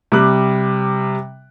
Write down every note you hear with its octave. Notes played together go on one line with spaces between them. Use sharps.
C3 G3 D6 F#6